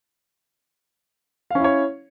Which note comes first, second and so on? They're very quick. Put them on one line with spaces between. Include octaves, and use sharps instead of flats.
F5 C#4 E4 C#5